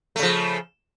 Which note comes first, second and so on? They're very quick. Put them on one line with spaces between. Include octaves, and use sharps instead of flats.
A3 C#3 F3